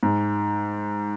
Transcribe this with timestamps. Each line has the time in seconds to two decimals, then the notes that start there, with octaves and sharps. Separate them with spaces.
0.03 G#2